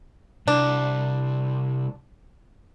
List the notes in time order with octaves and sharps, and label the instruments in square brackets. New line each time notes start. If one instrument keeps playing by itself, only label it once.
[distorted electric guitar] C2 [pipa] D4